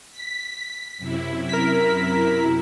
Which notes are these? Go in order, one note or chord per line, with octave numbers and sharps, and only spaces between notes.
B6
F#2 C3 E4
A#4 B6